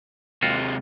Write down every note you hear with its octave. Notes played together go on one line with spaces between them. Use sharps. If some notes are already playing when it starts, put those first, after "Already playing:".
D#2 C3 G#3 F4 F#4